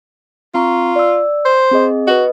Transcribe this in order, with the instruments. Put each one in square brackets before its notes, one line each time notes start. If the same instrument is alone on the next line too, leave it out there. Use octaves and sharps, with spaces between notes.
[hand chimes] C4 A#5 C#6 [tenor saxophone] F4
[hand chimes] D5 E6
[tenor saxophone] C5
[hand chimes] C4 G#4 D#5
[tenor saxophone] F#4 [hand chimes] B4 D#5